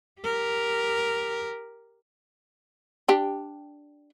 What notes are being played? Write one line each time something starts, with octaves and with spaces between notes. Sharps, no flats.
G4 A#4
D4 G4